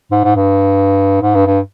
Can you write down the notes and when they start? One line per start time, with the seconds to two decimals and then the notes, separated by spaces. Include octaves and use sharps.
0.11 G#2
0.24 G#2
0.36 G2
1.22 G#2
1.35 G2
1.46 G2